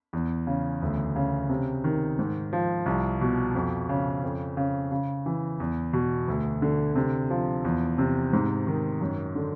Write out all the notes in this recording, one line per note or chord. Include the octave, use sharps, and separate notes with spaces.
E2
C#3
D2
C#3
C3
D#3
G#2
F3
C2
B2
F2
C#3
F2
C#3
C#3
E3
E2
B2
D2
D3
C3
F3
E2
C3
G#2
D#3
F#2
D3